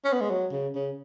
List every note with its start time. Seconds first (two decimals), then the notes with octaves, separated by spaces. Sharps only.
0.04 C#4
0.13 B3
0.21 G#3
0.30 F#3
0.52 C#3
0.75 C#3